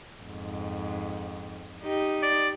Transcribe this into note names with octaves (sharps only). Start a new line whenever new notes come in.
F2 G#2
D#4 G4 D#5
D5